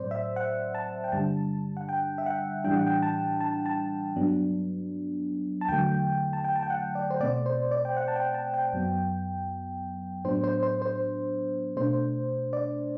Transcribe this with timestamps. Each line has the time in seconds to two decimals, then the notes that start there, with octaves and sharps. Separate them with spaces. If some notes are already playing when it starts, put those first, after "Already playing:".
Already playing: A2 F#3 C4 C5 D5
0.11 E5
0.36 F#5
0.75 A5
1.04 G5
1.12 G2 D3 G3 D4 A5
1.77 F#5
1.89 G5
2.18 E5
2.26 F#5
2.64 A2 E3 G3 D4 G5
2.75 F#5
2.86 G5
3.02 A5
3.41 A5
3.66 A5
4.16 G2 F#3 B3 D4
5.61 A5
5.68 E2 D3 F#3 A3 G5
6.33 A5
6.44 G5
6.56 A5
6.63 G5
6.70 F#5
6.95 D5
7.10 C5
7.20 B2 A3 C4 D5
7.46 C5
7.71 D5
7.85 G5
7.97 F#5
8.08 A5
8.16 G5
8.34 A5
8.54 G5
8.73 F#2 F#3 B3
10.25 A2 F#3 B3 D4 C5
10.44 C5
10.63 C5
10.82 C5
11.77 B2 A3 D4 C5
12.53 D5